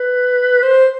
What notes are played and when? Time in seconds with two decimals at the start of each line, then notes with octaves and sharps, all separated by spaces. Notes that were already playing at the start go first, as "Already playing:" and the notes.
Already playing: B4
0.62 C5